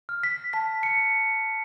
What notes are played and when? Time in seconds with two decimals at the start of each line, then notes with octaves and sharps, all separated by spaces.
0.09 F6
0.23 B6
0.53 A5 B6
0.83 C#7